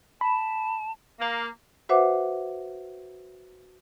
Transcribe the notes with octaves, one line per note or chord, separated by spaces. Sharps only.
A5 B5
A#3
F#4 B4 C5 E5 F#5 D6